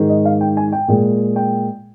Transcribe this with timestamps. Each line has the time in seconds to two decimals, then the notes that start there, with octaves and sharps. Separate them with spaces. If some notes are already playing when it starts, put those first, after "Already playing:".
Already playing: G#2 D#3 G#3
0.10 D#5
0.25 F5
0.41 G5
0.57 G#5
0.72 G5
0.88 A#2 G#3
1.36 G5